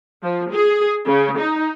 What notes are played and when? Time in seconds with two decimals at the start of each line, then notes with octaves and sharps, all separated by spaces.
0.23 F3
0.52 G#4
1.07 C#3
1.38 D#4